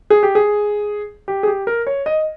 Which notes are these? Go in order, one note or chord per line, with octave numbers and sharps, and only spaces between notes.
G#4
G4
G#4
G4
G#4
G4
A#4
C#5
D#5